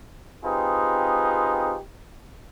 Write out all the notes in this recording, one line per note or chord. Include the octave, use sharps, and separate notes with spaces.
C4 D#4 F4 G4 G#4 B4